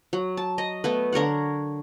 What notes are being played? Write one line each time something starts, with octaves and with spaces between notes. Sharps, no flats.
F#3
A5
D#5 A#5
A3 B3 B4
D3 A#4 C#5 F#5